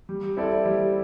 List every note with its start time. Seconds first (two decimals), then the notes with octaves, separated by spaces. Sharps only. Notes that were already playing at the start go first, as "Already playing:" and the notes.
0.09 G3
0.37 C4 E4 A4 D5
0.65 G3